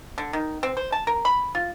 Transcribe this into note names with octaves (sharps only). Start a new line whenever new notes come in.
D3
D#3
C4
C5
A5
A#4
B5
F4